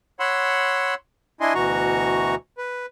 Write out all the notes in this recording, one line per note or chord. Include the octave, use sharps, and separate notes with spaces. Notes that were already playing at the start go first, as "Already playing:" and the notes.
C#5 F#5 B5 C6 E6
D4 E4 D#5 G#5 C6
D2 B2 E3 F#4 A#5 C#6
B4